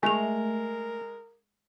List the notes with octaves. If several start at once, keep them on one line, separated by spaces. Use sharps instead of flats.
G#3 A3 A#4 G#5 F7